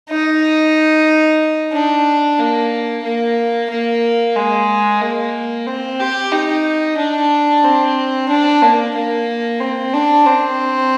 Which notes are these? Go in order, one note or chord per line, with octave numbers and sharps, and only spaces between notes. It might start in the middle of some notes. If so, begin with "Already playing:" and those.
D#4
D4
A#3
A#3
A#3
G#3
A#3
C4
G4
D#4
D4
C4
D4
A#3
A#3
C4
D4
C4